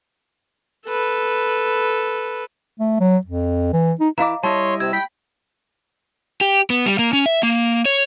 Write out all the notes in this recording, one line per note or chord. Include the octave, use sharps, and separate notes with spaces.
A4 B4
A3
F#3
F2
E3
D#4
E3 E4 D#5 F5 A#5 D6
G3 E4 C#5 D#5 A5 C6
C3 E6 G#6
G5 B5 B6
G4
B3
G3
A#3
C#4
E5
A#3
C#5